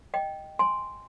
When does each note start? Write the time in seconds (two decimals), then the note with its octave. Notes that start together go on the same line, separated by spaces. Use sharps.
0.14 D#5 G5
0.59 G#5 C6